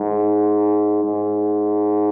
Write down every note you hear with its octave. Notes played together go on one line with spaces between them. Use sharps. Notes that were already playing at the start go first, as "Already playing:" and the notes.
Already playing: G#2
G#2